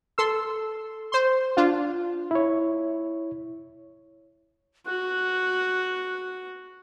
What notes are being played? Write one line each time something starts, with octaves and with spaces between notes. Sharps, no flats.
A4 C6 E6
C5 C6
D4 F4
E4 C#5
F#4 F#6